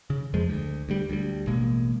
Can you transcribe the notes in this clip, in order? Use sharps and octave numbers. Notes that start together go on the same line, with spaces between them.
C#3
F2 F3 G#3
D2
D2 G3
D2 G3
A1 B2 G#3 A#3